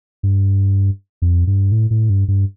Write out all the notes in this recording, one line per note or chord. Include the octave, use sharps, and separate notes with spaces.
G2
F2
G2
A2
A2
G2
G2